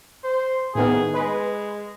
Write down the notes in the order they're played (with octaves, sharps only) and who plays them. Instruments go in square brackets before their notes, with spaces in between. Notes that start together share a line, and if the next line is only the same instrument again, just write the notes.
[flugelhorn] C5
[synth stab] A2 D#3 B3 [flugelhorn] G#4
[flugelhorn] G#3 [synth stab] B4